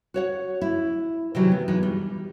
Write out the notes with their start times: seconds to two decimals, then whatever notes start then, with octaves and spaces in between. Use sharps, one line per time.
0.14 F#4 C#5 F#5
0.61 E4
1.35 C3 D#3 E3 F#3
1.51 B3
1.68 E3 G#3 D#4
1.83 G3